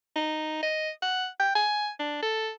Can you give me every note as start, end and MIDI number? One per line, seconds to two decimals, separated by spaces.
0.16 0.59 63
0.62 0.90 75
1.02 1.27 78
1.40 1.53 79
1.55 1.90 80
1.99 2.22 62
2.23 2.50 69